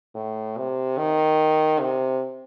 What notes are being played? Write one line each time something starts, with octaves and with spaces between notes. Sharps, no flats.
A2
C3
D#3
C3